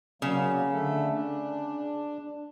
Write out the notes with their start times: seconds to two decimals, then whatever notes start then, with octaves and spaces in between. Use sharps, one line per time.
0.22 C#3 F#3 A#3
0.73 D3 A3 A4
1.12 D4